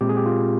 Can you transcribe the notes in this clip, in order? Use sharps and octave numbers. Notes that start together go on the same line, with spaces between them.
A#2 G#3 C4 G4
G#4
G4
F4